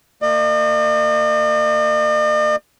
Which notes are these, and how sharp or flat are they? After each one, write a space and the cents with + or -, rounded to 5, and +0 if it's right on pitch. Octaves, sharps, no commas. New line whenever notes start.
A#3 -40 D#5 -45